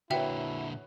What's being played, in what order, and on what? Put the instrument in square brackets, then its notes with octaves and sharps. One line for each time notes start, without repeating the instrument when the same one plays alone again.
[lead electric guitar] A#2 D3 [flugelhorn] E4 [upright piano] F#4 B4 C#5 [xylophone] E5 G5